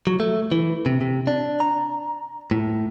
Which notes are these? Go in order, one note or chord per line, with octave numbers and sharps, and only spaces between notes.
F#3
A3
E3
C3
C3
D4
A#5
A2